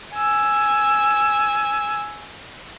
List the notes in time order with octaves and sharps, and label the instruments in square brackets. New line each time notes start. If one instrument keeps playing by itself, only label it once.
[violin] G#5 E6